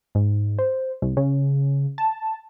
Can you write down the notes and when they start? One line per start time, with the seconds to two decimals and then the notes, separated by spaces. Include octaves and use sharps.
0.15 G#2
0.59 C5
1.02 C2
1.17 C#3
1.98 A5